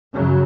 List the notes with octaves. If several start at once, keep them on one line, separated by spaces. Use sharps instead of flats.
F#2 C#3 F#3